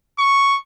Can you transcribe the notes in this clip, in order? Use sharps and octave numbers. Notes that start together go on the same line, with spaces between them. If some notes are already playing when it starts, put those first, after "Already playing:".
C#6